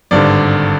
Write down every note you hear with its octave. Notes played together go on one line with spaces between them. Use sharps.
G#1 G2 D3 D5